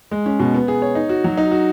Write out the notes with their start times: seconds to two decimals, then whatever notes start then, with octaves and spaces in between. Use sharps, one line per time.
0.11 G#3
0.26 C#4
0.39 B2
0.54 B3
0.68 G#4
0.82 C#5
0.95 D#4
1.09 F#4
1.24 F#3
1.37 D#4
1.51 F#4